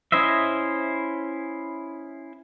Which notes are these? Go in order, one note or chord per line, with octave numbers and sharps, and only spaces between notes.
C#4 E4 C5 D#5 E5